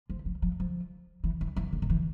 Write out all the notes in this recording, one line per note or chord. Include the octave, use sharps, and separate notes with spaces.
F3
F3
F3
F3
E3
E3
E3
D3
D#3
E3